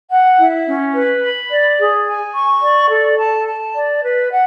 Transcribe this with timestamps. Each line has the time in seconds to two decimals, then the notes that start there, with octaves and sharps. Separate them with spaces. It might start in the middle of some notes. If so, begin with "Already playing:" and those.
0.10 F#5
0.38 E4
0.66 C#4
0.94 B4
1.22 B5
1.51 D5
1.78 G#4
2.07 G#5
2.34 C#6
2.62 D5
2.90 A4
3.18 A5
3.47 A5
3.74 D5
4.02 B4
4.30 F#5